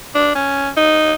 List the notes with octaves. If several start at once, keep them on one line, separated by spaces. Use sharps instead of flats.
D4
C#4
D#4